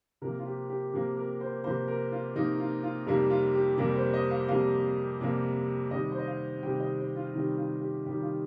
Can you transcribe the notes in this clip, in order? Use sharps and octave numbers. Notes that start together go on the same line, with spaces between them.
C3 F3 A#3 A#4
F4
G4
G4
C3 F3 A#3
A#4
C5
C3 F3 A#3 C5
A#4
F4
C3 F3 A#3 D#4
F4
F4
F2 C3 G3 A#3 D#4
F4
G4
F2 C3 G3 A#3 A#4
C5
D#5
F5
F2 C3 G3 A#3 F5
F2 C3 G3 A#3
C3 D#3 G3 D#5
C5
D#5
F5
C3 D#3 G3 G5
D#5
C5
F4
C3 D#3 G3 D#4
F4
G4
C3 D#3 G3 G4
F4